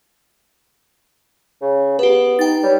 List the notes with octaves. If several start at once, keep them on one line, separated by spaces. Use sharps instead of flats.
C#3
B3 G4 B4
D#4 G5 A6
G3 C#5